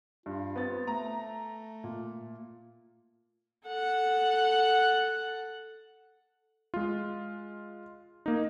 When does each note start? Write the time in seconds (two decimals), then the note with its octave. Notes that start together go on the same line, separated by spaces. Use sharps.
0.26 G2 F4
0.56 B3 C4 A6
0.87 A3 A#5
1.84 A#2
3.67 A4 F#5
6.74 G#3 F4
8.26 A#3 D#4